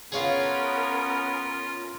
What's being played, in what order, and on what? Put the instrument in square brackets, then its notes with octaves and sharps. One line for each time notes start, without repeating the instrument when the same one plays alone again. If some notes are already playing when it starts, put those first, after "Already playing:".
[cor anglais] B3 [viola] C#4 A#4 [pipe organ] F4 [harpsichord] G#4 C#5 F5